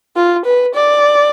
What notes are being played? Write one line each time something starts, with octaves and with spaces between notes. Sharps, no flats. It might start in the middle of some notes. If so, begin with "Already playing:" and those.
F4
B4
D5